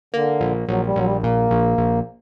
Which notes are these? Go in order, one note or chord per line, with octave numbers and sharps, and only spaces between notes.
D3 A#3
A#1
A#1 F#3
G3
A#1 F#3
G3
A#2 A#3
A#1
A#1